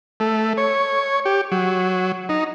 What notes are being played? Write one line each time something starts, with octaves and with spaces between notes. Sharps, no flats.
A3
C#5
G4
F#3
D#4